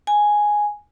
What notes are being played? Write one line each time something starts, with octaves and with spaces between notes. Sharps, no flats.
G#5